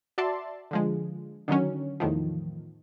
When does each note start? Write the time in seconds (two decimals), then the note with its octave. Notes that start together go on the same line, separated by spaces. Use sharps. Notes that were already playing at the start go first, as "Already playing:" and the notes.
0.18 F#4 D5 E5 A5 C6
0.71 D3 F3 G#3
1.48 D3 D#3 F#3 C#4
2.00 E2 A2 D#3 F3